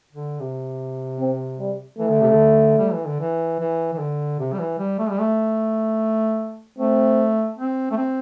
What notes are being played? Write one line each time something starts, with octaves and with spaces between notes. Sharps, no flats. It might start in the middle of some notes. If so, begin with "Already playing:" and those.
D3
C3
C4
G3
E3 A3
D3
C3
D3
G3
E3
D3
E3
E3
E3
D3
C3
G3
E3
G3
A3
G3
A3
A3 C4
C4
A3
C4